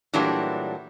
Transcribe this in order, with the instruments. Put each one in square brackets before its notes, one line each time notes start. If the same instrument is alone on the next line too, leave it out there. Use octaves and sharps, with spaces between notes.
[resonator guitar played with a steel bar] A#2 E3 F#3 G3 A3 D4